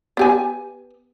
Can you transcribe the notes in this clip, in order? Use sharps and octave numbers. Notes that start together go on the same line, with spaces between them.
B3 G4 G#5